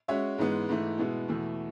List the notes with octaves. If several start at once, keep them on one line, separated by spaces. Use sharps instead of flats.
G#3 C#4 F#4 C#5 E5
G#2 E3 G#3 B3
G#2 E3 A3
B2 G#3 B3 E4
E2 B2 A3 E4